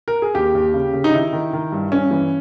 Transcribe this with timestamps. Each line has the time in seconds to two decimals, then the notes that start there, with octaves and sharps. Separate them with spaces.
0.08 A#4
0.22 G#4
0.35 D#2 G4
0.55 D#2
0.74 C#3
0.93 C#3
1.04 D#4
1.14 D#3 E4
1.33 D#3
1.53 D#3
1.72 G2
1.92 G2 C#4
2.11 E3